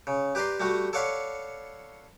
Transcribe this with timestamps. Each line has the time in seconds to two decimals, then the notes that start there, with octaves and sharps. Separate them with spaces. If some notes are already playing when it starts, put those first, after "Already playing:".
0.07 C#3
0.35 G4 B4 D5 A#5 C6
0.60 G3 A3 F#4
0.93 A4 C#5 D5 F5 F#5 B5